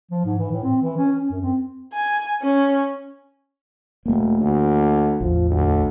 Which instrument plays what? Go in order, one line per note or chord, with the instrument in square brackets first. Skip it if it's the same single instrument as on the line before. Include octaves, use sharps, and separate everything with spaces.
[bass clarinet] F3
G#2
E3
A2
C4
E3
C#4
C#4
F#2
C4
[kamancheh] G#5
C#4
[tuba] E1 [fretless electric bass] A3 A#3
[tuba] D2
[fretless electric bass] A1 E2 [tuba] F3
[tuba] D2